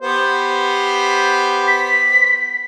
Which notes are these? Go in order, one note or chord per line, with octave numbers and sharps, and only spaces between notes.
B3 G4 C5
B6